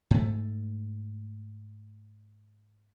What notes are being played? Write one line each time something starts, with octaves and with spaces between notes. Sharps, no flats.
G#2 A3